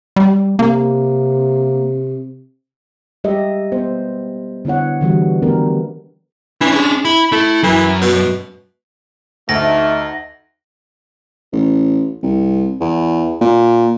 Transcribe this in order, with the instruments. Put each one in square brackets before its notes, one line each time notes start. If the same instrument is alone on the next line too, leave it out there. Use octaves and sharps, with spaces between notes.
[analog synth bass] G3
[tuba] C3 [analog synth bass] A#3
[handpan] G3 G#3 G4 D#5 E5
B3 C5
D3 B3 E4 C#5 F#5
D3 E3 G3 F#4
D#3 A3 B3 D4 G4 A#4
[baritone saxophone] E3 [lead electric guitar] C#4 D4
[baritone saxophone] G#3
[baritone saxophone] E4 [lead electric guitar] B5
[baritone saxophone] A3 [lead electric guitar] E4
[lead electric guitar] F#2 [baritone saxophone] E3
[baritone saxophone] B2
[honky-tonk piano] D2 [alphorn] A3 [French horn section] D#4 [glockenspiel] A#6
[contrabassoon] A1
C2
E2
A#2